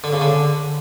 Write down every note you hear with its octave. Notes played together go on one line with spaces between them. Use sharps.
D3
C#3
D3